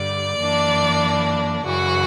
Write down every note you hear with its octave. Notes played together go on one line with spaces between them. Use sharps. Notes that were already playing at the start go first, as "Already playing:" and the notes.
Already playing: G2 D3 G3 D5
F#2 E3 A#3 D4
F#2 C#3 E3 F#4